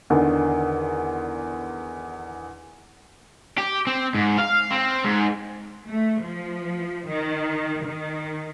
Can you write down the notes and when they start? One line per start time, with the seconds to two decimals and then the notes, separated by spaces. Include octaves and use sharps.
0.10 E2 D3 D#3
3.58 G4
3.87 C4
4.15 G#2
4.38 F5
4.71 C4
5.04 G#2
5.90 A3
6.23 F3
7.08 D#3
7.85 D#3